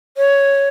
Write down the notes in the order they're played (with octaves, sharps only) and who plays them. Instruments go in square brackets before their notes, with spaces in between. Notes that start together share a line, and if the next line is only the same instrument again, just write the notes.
[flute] C#5